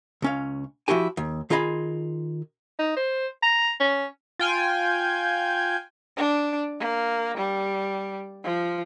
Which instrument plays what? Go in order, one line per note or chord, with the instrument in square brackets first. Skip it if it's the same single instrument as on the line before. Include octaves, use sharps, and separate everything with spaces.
[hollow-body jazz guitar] C#2 C#4 F5
F3 F#3 E4 F#4 G4 G#5
D#2
D#3 F4 G#4 D#5 A#5 B5
[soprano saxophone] D#4
C5
A#5
C#4
[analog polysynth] F4 G5 G#5
[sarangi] D4
A#3
G3
F3